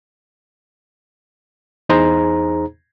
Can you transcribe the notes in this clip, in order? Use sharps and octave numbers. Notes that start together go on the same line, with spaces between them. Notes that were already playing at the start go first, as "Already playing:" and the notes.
E2 D#4 G#4 C5 A#5